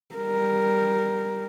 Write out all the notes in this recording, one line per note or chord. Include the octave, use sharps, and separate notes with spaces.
G3 A#4